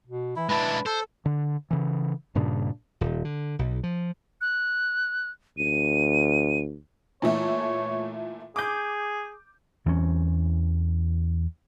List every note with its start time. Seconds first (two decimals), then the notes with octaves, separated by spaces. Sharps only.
0.07 B2
0.36 E3 E4
0.49 G#3 D4 E4 B4
0.86 A4 C5
1.26 D3
1.71 C#3 E3
2.35 G2 A#2 C#3 D4
3.01 D#1
3.25 D3
3.59 B1
3.83 F3
4.41 F#6
5.58 D2 D#7
7.22 A#2 E3 A3 C#5
8.56 G#4 D6 G6
9.86 E2 E3 C4 C#4